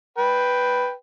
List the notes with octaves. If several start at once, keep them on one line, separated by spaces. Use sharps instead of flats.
B4 G5